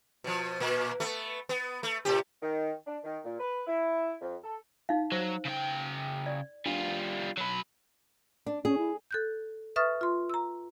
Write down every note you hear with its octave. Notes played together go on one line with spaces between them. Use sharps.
B2 F3
A#2 A#3
A3 B3
B3
A3
A2 C3 G4
D#3
D4
D#3
A#2
B4
E4
F2
A4
D#4 F5
F#3 C5
C#3 G5
D5
G3 D4 F4
F#3 B4
D4
C#4 G#4
E4
A4 F#6 G6
B4 E5 C#6 D#6 F6 A6
F4 C6
A#5 E6